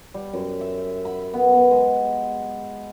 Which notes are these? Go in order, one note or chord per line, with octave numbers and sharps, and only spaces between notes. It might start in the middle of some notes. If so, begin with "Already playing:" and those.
G3
F#2
E5
B5
B3
B3
G#3